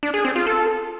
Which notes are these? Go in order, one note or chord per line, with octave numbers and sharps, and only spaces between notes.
D4
G#4
C4
F4
A4